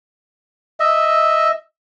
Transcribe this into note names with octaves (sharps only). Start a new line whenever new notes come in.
D#5 E5